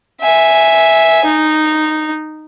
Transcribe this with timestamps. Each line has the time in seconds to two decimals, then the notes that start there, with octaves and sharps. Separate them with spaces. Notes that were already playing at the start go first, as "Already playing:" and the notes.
0.21 E5 G#5
1.25 D#4